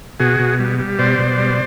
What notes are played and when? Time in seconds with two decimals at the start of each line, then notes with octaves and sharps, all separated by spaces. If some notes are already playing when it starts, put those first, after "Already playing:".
0.20 B2 F#4 G#4
0.40 B2
0.59 G3
0.79 G3
0.98 B2 C5 D5
1.19 B2
1.38 G3